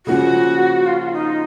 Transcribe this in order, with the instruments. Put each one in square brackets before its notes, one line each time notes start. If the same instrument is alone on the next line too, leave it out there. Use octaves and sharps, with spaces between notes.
[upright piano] C#3 F3 A#3 C#4 F4 [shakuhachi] F#4
[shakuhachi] F4
D#4